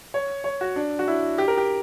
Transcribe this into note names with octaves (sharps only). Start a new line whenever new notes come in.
C#5
C#5
F#4
D4
F#4
E4
G4
A#4
G4